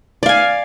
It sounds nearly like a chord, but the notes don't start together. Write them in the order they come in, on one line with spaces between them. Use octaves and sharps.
D5 F5 G#5